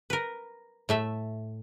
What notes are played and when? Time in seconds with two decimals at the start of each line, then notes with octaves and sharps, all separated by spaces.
0.10 A#4 B4
0.89 A2 A3 E5